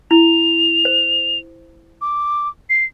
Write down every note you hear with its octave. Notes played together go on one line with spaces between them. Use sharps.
E4 F7
C5
D6
C7